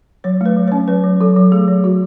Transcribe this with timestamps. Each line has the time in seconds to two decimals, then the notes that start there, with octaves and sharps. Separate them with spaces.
0.24 F#3 C#5
0.41 A3 B4
0.57 F#3
0.68 C#4 C#5
0.88 F#3 B4
1.04 F#3
1.21 F#3 A4
1.36 F#3
1.52 A3 G#4
1.68 F#3
1.83 F#3 F#4